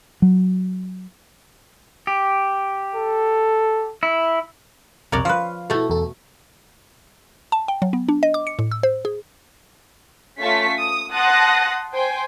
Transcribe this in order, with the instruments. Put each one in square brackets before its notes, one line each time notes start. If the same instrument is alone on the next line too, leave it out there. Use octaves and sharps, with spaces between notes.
[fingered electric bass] F#3
[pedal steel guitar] G4
[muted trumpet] A4
[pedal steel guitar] E4
[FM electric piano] B1 F2 C3 [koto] A#4 C#5 D5
[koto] F3 B4 [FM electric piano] F5
[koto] B2 A3 [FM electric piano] E4 A4
[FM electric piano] E2 A4
[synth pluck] A5
G5
F#3
B3
D4
D#5
D6
C#7
A2
E6
C5
G#4
[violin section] A3 C#4 F4 A5 C#6 B6
D#6
F#5 A5 C6 D#6 F#6 A#6
C5 G5 G#5 C6